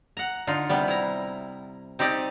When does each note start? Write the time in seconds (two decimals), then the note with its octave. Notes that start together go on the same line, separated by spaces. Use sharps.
0.17 F#5 A#5
0.47 D3 D#4 F4
0.69 C3 G3 B3
0.88 E4 A#5
1.99 C4 D#4 G4 D5 D#5